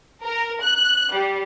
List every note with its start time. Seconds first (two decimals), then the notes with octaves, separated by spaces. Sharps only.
0.22 A#4
0.61 F#6
1.12 G3